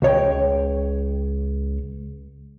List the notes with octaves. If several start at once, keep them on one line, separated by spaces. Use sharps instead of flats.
C#2 C#5 G5